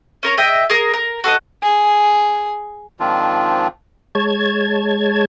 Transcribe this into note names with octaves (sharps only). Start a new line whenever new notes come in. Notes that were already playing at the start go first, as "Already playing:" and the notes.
C#4 A#4 C#5
G#4 D#5 E5 G5
G#4 A#4
A#4
F#4 A4 C5 D#5
G#4
G#2 D#3 F3 C4 D4 F4
G#3 C#5 A5 G#6